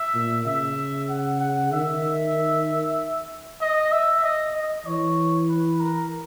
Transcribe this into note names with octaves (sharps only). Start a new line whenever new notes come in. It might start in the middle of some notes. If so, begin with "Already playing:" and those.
Already playing: E5
A#2
C#3 E5
F#5
F#5
D#3 E5
D#5
E5
D#5
D#5
E3 C#5
B4
A#4